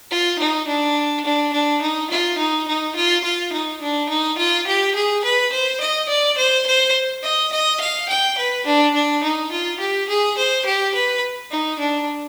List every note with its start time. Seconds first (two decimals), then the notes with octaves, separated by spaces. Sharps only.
0.11 F4
0.39 D#4
0.68 D4
1.25 D4
1.53 D4
1.81 D#4
2.10 F4
2.38 D#4
2.68 D#4
2.95 F4
3.24 F4
3.53 D#4
3.81 D4
4.09 D#4
4.38 F4
4.67 G4
4.95 G#4
5.24 B4
5.52 C5
5.81 D#5
6.09 D5
6.37 C5
6.66 C5
7.23 D#5
7.52 D#5
7.80 F5
8.08 G5
8.38 B4
8.66 D4
8.94 D4
9.23 D#4
9.51 F4
9.80 G4
10.09 G#4
10.37 C5
10.65 G4
10.94 B4
11.51 D#4
11.79 D4